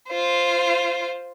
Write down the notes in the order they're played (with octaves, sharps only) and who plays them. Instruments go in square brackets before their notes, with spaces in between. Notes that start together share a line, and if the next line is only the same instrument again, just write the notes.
[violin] F4 C5